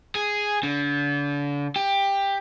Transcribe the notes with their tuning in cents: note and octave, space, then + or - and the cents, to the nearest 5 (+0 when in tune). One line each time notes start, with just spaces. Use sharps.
G#4 +0
D3 -35
G4 +15